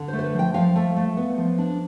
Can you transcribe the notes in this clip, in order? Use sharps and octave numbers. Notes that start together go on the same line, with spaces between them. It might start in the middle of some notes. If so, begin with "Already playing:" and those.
Already playing: D3
C5
A3
C5
B4
F3
G5
F3 F5
A3
A3
B3
F3
D4